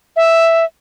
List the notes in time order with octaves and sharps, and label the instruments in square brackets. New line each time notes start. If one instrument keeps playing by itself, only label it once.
[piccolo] E5